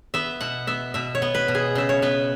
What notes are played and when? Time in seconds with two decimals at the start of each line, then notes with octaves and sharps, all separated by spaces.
0.14 B3 E5
0.41 B2 F#5
0.67 B3 E5
0.94 B2 E5
1.15 C#5
1.22 B3
1.34 B4
1.48 B2
1.55 G#4
1.75 C#3 E5
1.89 C#5
2.02 B3 B4